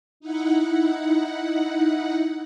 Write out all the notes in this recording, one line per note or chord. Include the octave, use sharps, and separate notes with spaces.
D#4 E4 F#5